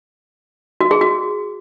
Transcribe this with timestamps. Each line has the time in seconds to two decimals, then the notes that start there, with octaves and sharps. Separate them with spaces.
0.80 F#4
0.91 G#4
1.01 F#4